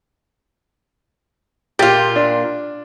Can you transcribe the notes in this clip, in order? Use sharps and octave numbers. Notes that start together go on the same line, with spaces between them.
A#2 F4 G4
D4